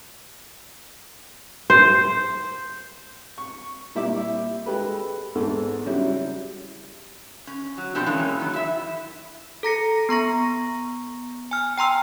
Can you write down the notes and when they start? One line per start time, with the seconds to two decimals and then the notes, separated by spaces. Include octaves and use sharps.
1.70 C5
3.38 C#6
3.95 A#2 G3 E4 E5 D6
4.66 G#3 G4 A4 B4
5.35 E2 G#2 A4
5.86 C#3 F#3 G3 E4
7.47 C#4
7.78 F#3
7.95 B2 F3 C4 D4 G4
8.06 E3 G#3 A#3 C#4
8.40 D#3 F#3
8.53 E4 E5
9.63 A4 A#5 A#6 C#7
10.09 B3 A#5 C#6 A#6
11.51 G#5 F6
11.78 G5 A#5 C6 E6